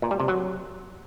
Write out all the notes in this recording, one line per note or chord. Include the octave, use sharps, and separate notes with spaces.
A#2
G3
C3
F#3